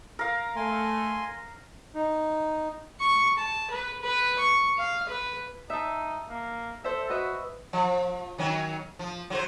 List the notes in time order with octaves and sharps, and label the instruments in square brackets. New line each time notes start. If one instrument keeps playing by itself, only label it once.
[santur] A#4 F5
[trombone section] A3 [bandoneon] G#5 C6
[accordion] D#4
[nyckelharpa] C#6
A5
B4
B4
C#6
F5
B4
[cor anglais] D#4 [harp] E5 A5
[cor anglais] A#3
[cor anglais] A4 [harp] C5 E5
[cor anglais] F#4 [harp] B4 D#5 E5
[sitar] F3
D#3 F#3 C#4
F3
F#3 E4 C5